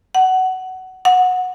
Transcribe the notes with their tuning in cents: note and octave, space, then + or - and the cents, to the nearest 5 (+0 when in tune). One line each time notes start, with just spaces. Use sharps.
F#5 +15
F#5 -15